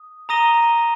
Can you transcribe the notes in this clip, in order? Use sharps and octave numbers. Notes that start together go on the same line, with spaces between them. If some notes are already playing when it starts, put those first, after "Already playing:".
Already playing: D#6
A#5 D#6 A#6 D#7 G7